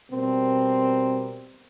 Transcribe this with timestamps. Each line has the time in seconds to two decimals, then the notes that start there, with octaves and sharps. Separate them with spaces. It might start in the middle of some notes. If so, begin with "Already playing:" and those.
0.11 B2 G3 C4 A#4